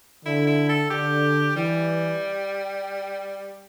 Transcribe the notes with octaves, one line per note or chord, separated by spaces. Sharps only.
D3 E4
E4
A4
D3 G4
E3 G3